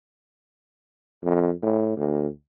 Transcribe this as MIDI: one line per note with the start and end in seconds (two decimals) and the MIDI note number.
1.24 1.52 41
1.62 1.93 45
1.97 2.27 38